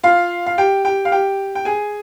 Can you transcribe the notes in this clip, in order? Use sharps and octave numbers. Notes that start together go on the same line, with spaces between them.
F4 F5
F5
G4 G5
G4 G5
F5
G4 G5
G5
G#4 G#5